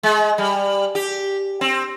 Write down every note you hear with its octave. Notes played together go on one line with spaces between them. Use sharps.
G#3
G3
G4
C4